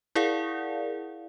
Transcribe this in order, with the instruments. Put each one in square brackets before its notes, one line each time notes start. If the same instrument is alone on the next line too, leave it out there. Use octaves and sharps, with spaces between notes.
[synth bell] E4 G#4 A#4 D5 F5 F#5